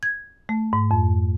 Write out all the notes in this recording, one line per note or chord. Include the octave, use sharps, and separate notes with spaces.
G#6
A3
G#2
F2